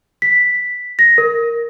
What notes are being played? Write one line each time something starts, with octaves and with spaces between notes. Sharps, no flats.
B6
A#6
A#4